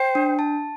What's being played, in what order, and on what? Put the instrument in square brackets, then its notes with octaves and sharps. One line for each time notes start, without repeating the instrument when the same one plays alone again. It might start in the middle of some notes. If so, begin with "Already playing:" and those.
Already playing: [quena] C5 [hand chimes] G5
[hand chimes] D4
A5